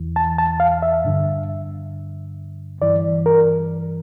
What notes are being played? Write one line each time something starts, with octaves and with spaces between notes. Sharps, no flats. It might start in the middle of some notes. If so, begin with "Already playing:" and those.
Already playing: E2 E3
A5
A5
F5
E5
G2 D3
G2 E3 D5
A#4